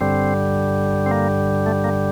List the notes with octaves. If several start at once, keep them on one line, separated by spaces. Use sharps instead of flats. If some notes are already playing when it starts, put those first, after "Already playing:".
G2 D3 G3 C4
C4
A#3
A3
A#3